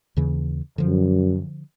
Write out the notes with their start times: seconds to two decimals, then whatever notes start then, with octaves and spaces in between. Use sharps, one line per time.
0.17 D#2 C#3 E3
0.78 F#2 D3 F3